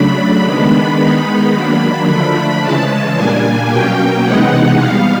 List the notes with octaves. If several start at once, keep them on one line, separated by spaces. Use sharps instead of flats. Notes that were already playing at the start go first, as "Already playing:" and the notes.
Already playing: C#3 F#3 A3 D4 B5
D#3 G#3 B3 D4 B5
D#3 G#3 B3 D#4
D#3 F#3 A#3 D4
D3 F3 A3 D4 B5
C#3 E3 G#3 C#4 A5
A#2 G3 A#3 D4 G#5
B2 F#3 A#3 C#4 G5
C3 E3 G#3 B3 D#4 F#5
B2 G3 B3 F5